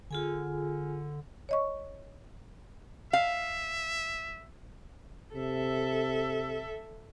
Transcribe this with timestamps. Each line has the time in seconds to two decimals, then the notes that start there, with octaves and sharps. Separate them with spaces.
0.11 D3 F4 G#4 G#5
1.49 C#5 D#5 C#6
3.13 E5 F5
5.36 C3 A4 E5